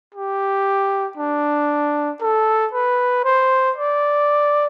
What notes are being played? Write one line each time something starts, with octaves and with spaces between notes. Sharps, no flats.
G4
D4
A4
B4
C5
D5